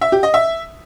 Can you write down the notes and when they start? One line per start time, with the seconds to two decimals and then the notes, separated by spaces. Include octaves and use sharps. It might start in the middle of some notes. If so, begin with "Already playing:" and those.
0.01 E5
0.12 G4
0.23 D#5
0.34 E5